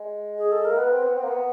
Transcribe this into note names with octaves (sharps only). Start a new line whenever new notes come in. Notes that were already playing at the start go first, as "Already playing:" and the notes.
Already playing: G#3
G#4
A4
A#4
A#3
B3 B4
C4
B3
C4
A#3
B3